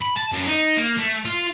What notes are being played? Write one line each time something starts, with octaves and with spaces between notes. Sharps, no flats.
B5
A5
F#2
D#4
A#3
A3
F4